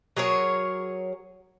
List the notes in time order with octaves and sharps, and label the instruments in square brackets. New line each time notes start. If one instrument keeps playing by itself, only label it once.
[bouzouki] F#3 G#4 A#4 C#5